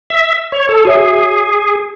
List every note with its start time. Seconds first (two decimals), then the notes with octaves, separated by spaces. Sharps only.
0.10 E5
0.52 C#5
0.69 A4
0.85 F#4 G#4 C#5 E5